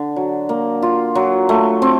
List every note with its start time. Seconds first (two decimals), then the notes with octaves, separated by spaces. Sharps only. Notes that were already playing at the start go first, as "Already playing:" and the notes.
Already playing: D3
0.16 F#3
0.49 A#3
0.82 F4
1.15 F#3
1.49 A3
1.82 C4